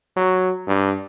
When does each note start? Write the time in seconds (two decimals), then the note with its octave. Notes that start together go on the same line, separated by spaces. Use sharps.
0.17 F#3
0.67 G2